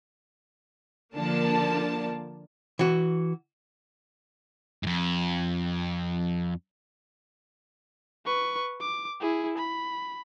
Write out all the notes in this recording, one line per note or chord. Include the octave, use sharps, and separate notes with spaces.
D3 F3 A#3 D4 A5
E3 F#4
F2 G#2
B4 C#6
D6
E4 G#4
B5